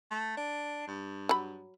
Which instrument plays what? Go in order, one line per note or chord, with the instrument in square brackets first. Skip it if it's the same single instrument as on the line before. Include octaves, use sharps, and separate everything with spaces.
[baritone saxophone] A3
D4
G2
[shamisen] F#3 B5